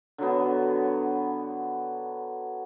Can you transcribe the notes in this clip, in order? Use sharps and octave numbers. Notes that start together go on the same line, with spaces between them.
D3 F#3 B3